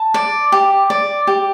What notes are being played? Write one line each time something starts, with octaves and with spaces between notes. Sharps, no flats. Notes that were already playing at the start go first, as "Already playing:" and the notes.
Already playing: A5
D5
G4
D5
G4